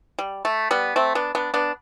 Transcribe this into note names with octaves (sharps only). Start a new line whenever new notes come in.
G3
A3
G3 B3
A3 C4
B3 D4
B3 D4
B3 D4